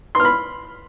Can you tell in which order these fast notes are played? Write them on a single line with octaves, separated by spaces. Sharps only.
C6 F6 B5